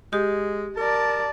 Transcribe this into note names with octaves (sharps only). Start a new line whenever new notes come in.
G#3 G4
A#4 D5 A5